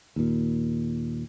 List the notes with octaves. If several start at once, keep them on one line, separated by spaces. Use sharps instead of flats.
D#2 A#2